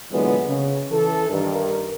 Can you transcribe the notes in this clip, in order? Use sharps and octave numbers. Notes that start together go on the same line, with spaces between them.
A#2 D3 E3 F#3 G#3 B3
C#3
E3 A4
G2 D#3 A#4